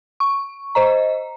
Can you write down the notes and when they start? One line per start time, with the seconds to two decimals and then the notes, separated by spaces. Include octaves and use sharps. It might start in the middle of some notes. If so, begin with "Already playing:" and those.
0.20 C#6
0.75 C5 D#5 A#5